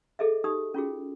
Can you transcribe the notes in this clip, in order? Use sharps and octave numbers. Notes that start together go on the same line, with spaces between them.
G#4 A4 D#5 E5
D#4 G4 D#6
C#4 F4 F#4 G#4